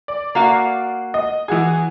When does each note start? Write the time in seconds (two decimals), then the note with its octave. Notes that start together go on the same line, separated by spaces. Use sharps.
0.08 D5
0.35 A#3 F#4 F5
1.14 D#5
1.48 E3 F#4 G#4